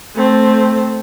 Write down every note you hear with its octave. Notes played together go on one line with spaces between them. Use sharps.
A3 C4